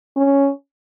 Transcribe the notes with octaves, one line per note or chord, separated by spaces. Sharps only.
C#4